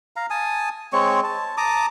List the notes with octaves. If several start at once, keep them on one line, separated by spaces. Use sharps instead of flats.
F5 A#5
G#5 A5 D#6
G#3 C4 C#5 C#6
A5
A5 A#5 D6 D#6